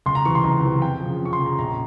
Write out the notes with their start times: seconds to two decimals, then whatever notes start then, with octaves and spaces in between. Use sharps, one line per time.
0.06 C#2 C6
0.15 A#5
0.25 C3 E3 C#6
0.35 C6
0.44 C#2 A#5
0.63 C3 E3
0.82 F2 G5
1.01 C#3 F3
1.20 F2
1.25 C#6
1.33 C6
1.39 C#3 F3
1.46 A#5
1.59 A#1 A#5